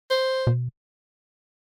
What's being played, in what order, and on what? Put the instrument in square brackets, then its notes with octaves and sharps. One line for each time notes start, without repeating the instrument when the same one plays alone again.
[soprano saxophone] C5
[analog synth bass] B2